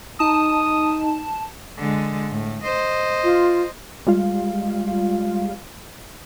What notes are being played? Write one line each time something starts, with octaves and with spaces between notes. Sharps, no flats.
D#4 A5 D#6
D3 G#3
A2
C5 D#5
F4
G3 G#3 F4 F5